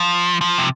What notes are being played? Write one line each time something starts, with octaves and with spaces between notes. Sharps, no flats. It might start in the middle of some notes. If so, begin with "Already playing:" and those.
Already playing: F3
F3
C3